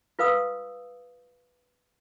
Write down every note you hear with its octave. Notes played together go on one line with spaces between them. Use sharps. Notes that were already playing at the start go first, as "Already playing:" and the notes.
F4 B4 F5 D#6 E6